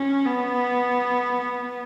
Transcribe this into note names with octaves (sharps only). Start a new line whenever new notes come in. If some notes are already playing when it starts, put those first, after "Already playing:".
Already playing: C#4
B3